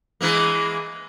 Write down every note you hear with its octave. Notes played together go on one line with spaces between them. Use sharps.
E3 G#3 A#3